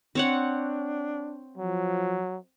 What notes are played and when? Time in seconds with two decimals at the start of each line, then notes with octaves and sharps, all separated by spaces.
0.15 C4 D4 C#5 F#5
1.58 F3 F#3